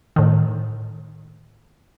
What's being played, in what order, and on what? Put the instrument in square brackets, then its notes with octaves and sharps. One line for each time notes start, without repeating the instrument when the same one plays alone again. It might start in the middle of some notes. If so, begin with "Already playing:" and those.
[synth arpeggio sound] A2 D#3